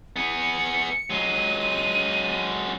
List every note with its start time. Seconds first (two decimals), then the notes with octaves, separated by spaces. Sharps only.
0.16 B3 G#4 C#7
1.10 F#3 G#3 D#7